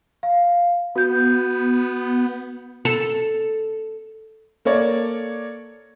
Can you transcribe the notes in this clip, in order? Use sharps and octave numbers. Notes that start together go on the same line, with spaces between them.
F5
B3 F#4 G6
A4
A#3 A4 C#5 D5